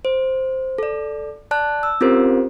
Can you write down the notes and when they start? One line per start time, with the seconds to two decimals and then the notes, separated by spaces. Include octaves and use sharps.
0.05 C5
0.78 A4 D5
1.51 D5 A5 F#6
1.83 E6
2.01 C4 C#4 F4 G4 A#4 C5